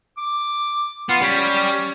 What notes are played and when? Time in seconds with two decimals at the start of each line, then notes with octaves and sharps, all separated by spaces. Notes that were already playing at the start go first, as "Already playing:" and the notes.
0.17 D6
1.09 B3 F4
1.22 G3 C#4